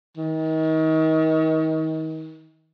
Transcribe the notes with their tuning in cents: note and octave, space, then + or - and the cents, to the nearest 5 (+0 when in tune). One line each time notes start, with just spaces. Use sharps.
D#3 +30